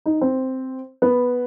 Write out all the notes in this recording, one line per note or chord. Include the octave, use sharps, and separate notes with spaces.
D#4
C4
B3